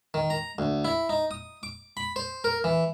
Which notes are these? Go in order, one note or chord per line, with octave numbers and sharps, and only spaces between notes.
D#3
A#5
D2
E4
D#4
D#6
D6
B5
C5
A#4
E3